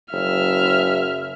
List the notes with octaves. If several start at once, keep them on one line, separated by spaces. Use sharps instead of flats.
F#1 E5 F6